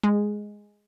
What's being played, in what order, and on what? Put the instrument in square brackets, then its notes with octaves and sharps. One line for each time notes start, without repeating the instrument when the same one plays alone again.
[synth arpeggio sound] G#3